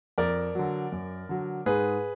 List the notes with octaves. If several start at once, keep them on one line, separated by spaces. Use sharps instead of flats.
F2 A#4 D5
D3 F#3
F#2
D3 F#3
G#2 G#4 B4